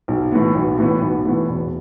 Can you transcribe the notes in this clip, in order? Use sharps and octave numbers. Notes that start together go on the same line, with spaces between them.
B1
A2 E3 B3
B1
A2 E3 B3
B1
A2 E3 B3
E1